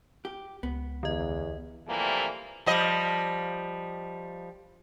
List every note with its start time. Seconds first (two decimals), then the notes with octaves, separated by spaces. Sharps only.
0.25 G4
0.63 C#2 B3
1.03 E2 D3 D#5
1.88 C3 E3 F3 G3 A3 A#3
2.66 F3 G3 D#5